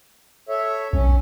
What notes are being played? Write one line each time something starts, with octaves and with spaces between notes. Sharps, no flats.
A4 C#5 E5
B1 C#4